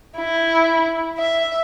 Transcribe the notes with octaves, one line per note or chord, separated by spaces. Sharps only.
E4
E5